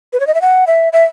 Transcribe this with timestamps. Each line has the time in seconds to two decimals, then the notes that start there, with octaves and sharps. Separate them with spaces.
0.13 B4
0.20 C#5
0.27 D#5
0.34 E5
0.41 F#5
0.67 E5
0.93 E5